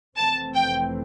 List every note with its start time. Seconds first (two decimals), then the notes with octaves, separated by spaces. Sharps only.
0.17 F1 F2 E3 A3 C4 A5
0.55 G5